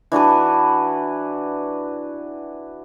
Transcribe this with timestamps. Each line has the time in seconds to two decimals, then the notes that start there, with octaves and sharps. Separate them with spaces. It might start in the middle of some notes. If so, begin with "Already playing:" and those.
0.12 E3 D4 F#4 B4